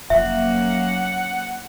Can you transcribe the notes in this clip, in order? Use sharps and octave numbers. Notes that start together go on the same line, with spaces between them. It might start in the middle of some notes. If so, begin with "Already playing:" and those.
F1 F#3 A#3 C#4 E5 F#5